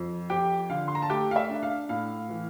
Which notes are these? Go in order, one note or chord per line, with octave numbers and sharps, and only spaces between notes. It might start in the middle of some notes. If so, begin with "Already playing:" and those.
Already playing: F2
F2 G4 G5
D3 F5
C6
A#5
A5
A3 G4 G5
F5
E5
D4
F5
A2 F5
E3